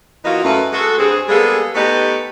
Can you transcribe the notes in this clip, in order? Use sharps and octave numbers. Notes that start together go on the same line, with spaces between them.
E3 A#3 D#4 F4 F#4
F#2 A3 B4
G#3 F#4 A4
G2 C4 G#4
G3 G#3 A#3 B3 G#4 A4
A3 B3 D#4 G4 B4